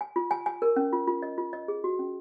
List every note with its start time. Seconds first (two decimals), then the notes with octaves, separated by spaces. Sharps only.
0.01 G#5
0.16 F4
0.31 G#5
0.46 G#5
0.62 A#4
0.76 C#4
0.93 F4
1.08 F4
1.23 D#5
1.38 F4
1.53 D#5
1.68 G#4
1.84 F#4
1.99 C#4